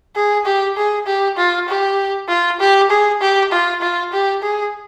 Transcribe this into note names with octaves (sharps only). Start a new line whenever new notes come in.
G#4
G4
G#4
G4
F4
G4
F4
G4
G#4
G4
F4
F4
G4
G#4